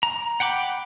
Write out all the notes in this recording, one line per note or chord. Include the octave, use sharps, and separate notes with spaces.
A#5
F#5 G5 B5 D6